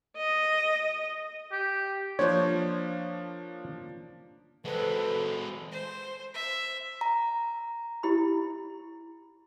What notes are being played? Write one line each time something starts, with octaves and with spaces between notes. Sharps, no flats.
D#5
G4
F3 A#3 D4 C5 C#5
G#3 F#4 A4 B4 C5 A5
C5
E5
A#5
E4 G4 B5